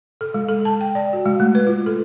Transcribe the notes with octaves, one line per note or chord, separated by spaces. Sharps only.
A4
G#3
A4
A5
G5
D5
F#4
G#3
A3
B4
F4
A4